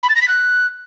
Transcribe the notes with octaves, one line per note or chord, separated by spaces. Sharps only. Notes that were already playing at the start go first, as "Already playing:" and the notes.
B5
A6
A#6
B6
F#6